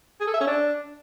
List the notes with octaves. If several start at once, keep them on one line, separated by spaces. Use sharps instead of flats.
G#4
A4
E5
C#4
D4